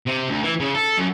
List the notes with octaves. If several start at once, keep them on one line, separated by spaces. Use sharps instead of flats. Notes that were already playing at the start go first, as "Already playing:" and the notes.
C3
D2
E3
C#3
A4
F#2